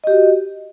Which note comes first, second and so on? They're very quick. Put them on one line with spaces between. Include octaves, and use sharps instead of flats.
D#5 G4 F#4